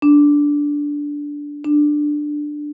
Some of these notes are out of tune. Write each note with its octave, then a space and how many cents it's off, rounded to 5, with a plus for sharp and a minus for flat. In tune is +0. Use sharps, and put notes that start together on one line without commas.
D4 -10
D4 +10